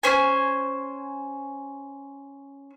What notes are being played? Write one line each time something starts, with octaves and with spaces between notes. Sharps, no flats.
C#4 C5 G#5